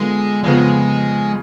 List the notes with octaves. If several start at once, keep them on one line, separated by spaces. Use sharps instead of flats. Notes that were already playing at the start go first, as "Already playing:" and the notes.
Already playing: D3 G#3 B3 F4
F2 C#3 F3 G#3 B3